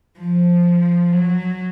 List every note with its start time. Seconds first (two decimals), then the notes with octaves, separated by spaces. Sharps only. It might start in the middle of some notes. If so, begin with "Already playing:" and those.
0.19 F3
1.12 F#3